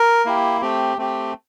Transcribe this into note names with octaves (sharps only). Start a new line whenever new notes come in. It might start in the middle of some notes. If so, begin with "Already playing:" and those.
Already playing: A#4
A#3 E4 G4
A3 C4 G4
A3 C4 G4